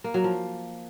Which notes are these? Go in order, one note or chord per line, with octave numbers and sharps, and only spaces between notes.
A#3
F#3
F3